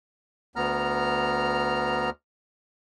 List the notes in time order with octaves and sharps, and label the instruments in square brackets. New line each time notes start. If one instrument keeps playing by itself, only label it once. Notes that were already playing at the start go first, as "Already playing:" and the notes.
[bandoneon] D2 B3 A#5 F6